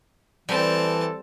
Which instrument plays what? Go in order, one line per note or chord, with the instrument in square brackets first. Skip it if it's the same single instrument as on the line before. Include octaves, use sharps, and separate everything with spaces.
[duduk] E3 [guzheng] G3 [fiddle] C4 A5 [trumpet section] A4